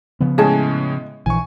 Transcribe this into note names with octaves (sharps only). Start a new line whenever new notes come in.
C#3 F3 B3
A2 G#3 C#4 G#4 D#5 A5
A#1 E3 G#5 C#6